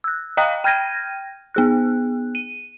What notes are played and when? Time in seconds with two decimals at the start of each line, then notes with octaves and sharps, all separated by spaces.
0.04 E6 F#6
0.37 D#5 F5 G5 A#5 D#6 F#6
0.64 G5 F6 G6 G#6 A#6 D#7
1.54 B3 G#4 F#6
2.35 D#7